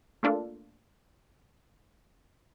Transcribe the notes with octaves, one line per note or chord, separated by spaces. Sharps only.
A3 A#3 D4 F4 A4